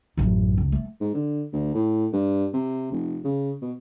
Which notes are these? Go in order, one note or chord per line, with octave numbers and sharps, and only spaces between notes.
A1 F#2
C#2
A3
G#2
D3
D2
A2
G2
C3
F1
C#3
B2